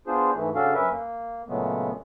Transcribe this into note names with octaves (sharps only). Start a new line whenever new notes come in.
B3 D4 F4 G#4 C5
G#2 E3 A3
C#3 C#4 D4 F#4 A4 F5
F#2 C#4 A#4 B4 E5
A#3
A#2 C#3 F#3 G#3 A3 B3